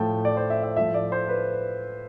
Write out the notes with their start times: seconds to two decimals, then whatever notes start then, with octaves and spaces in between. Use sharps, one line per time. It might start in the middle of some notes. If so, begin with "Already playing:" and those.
Already playing: A2 F3 A3 G5 A5
0.25 D5
0.37 C5
0.50 E5
0.63 E5
0.76 A2 F3 A3 E5
0.94 D5
1.12 C5
1.28 B4